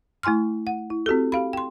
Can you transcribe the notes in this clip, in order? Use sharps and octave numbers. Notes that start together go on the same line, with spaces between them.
A3 E4 G#5 C6 F6
F#5
E4
C4 F#4 G4 A4
G4 F5 B5
G5 C6